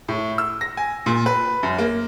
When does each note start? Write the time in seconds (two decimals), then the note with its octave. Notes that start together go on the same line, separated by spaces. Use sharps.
0.08 A2
0.38 E6
0.61 A#6
0.77 G#5
1.06 A#2
1.26 B4
1.63 F#2
1.78 A#3